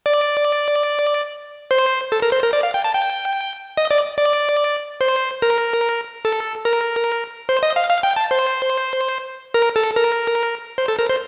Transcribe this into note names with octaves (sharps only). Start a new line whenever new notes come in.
D5
C5
A4
A#4
C5
A#4
D5
F5
G5
A5
G5
D#5
D5
D5
C5
A#4
A4
A#4
C5
D#5
F5
F5
G5
A5
C5
A#4
A4
A#4
C5
A4
A#4
C5